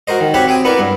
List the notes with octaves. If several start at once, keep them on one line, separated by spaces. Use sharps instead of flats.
F#4 A#4 C5 D#5
D#3
C4 F#4 G4 C#5 F#5 B5
C4 G5 G#5 D#6
B3 E4 A#4 B4 D5
G2